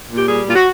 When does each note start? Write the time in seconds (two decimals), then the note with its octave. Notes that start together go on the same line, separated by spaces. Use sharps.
0.11 A#2
0.17 G4
0.28 G3 G#4
0.47 A#2 F4
0.55 F#4